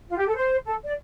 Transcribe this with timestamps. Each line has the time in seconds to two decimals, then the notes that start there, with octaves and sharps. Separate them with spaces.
0.10 F4
0.18 G4
0.27 A4
0.35 C5
0.65 A4
0.84 D5